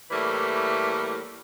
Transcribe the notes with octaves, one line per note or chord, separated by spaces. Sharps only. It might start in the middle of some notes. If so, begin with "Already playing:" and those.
A2 E3 G3 A3 A#3